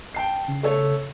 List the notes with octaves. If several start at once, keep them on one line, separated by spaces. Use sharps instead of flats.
G5 A5 C7
C#3
A3 A4 C#5